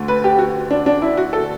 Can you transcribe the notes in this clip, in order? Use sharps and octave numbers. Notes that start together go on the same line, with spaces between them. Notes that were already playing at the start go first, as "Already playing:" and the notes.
Already playing: D2 D3
B4
G4
F#4
D4
D4
E4
F#4
A4